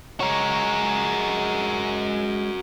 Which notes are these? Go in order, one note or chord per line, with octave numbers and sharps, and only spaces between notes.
G#3 F#4 A#4 C#5